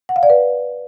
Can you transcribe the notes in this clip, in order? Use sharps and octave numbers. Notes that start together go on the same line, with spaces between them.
F#5
F5
D5
B4